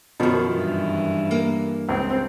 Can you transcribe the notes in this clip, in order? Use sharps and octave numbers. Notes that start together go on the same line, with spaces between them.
F#2 B2 D#3 F3
G2 E3
A#3
C#2 C4